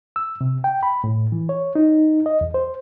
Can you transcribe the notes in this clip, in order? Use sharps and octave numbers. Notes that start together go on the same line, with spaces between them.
E6
C3
G5
B5
A2
E3
C#5
D#4
D#5
E2
C5